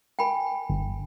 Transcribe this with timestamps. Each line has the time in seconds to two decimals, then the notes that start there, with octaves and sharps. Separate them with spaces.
0.19 G5 G#5 B5
0.70 G1